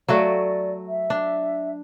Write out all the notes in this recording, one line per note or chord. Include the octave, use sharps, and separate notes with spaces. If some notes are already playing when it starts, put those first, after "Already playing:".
F#3 A3 F#4 D5
E5
D4